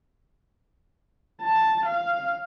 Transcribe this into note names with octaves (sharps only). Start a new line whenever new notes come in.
A5
F5